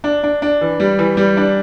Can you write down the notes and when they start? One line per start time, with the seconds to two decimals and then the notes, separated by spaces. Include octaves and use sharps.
0.04 D4
0.23 D4
0.42 D4
0.61 E3
0.80 G3
0.99 E3
1.17 G3
1.37 D4